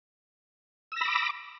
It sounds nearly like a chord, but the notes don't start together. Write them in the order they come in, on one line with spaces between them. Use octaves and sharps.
E6 A#6 B5 D6